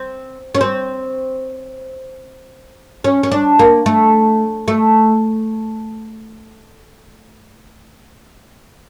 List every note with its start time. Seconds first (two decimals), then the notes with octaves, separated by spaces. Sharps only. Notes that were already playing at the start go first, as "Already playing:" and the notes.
Already playing: C4
0.55 C#4
0.61 C4
3.04 C#4
3.23 C#4
3.32 D4
3.59 A#3
3.86 A3
4.68 A3